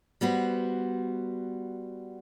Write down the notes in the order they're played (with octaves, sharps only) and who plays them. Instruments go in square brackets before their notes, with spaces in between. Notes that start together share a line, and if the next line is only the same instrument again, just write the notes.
[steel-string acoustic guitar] G3 B3 F#4 C5